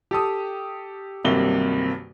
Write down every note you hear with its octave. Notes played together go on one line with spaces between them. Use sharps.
G4 A4 D#6
D#1 B1 G2 C3 A#3 G7